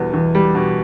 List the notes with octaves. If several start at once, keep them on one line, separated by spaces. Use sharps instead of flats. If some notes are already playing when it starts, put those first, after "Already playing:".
Already playing: E2 B2 E3 G3
E2
G3
B2